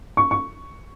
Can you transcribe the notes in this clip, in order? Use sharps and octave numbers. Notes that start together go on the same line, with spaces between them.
C#6
C#6